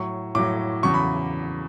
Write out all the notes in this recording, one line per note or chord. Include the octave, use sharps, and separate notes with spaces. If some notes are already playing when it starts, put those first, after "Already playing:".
Already playing: A2 F#3 C#6
A2 F#3 D6
E2 C#3 F#3 C#6
B5